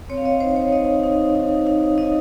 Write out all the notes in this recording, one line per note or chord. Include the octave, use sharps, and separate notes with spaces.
C4 C#5
F5
D#5
D#4 C5
C#5
D#4 D#5
D#4
D#4
D#4
D#4 D#5